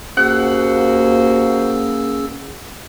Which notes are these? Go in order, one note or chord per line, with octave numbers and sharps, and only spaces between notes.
D#2 A#3 C#4 F#4 G#4 C5 F#5 E6